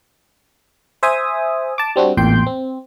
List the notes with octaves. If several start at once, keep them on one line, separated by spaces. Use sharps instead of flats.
C5 E5 G#5 D#6
A5 D6
G3 C4 D4 F#4
A1 E2 A#2 G5 C6 G6
C4